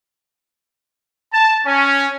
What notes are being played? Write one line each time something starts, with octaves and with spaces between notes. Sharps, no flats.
A5
C#4